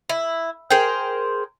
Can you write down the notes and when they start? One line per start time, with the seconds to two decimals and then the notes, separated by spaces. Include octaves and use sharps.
0.09 E4
0.70 G#4 A#4 C5 G5